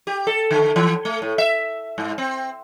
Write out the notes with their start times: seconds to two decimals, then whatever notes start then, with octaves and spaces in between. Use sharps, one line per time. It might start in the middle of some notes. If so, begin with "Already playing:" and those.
0.07 G4
0.27 A4
0.51 D3
0.76 E3
1.05 A3
1.22 A2
1.38 E5
1.98 G#2
2.18 C4